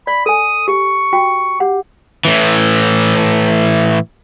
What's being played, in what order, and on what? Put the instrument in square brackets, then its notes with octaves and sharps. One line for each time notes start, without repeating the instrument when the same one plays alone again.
[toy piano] D5 [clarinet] B5
[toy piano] A4 G#5 [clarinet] D#6
[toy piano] G4 [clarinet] C#6
[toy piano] F#4 G5
[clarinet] G4 [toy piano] F#5
[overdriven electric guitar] A2 E3